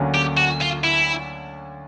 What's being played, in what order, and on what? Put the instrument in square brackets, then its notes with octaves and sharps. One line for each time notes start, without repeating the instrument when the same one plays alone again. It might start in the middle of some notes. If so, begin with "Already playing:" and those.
Already playing: [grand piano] D2 D3 F#3 A#3 C#4
[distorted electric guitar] G4
F#4
F4
E4